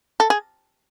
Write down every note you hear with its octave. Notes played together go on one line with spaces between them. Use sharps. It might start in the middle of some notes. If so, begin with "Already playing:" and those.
A4
G#4